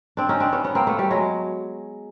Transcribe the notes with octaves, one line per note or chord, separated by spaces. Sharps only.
C4 D4
C#4 D#4
C4 D4
B3 C#4
B3 C#4
A#3 C4
A3 B3
G3 A3
F#3 G#3